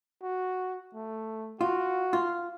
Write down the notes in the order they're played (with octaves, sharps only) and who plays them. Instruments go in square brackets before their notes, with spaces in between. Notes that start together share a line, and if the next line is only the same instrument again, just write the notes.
[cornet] F#4
A3
[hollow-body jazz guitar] F4 [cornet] F#4
[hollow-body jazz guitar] F4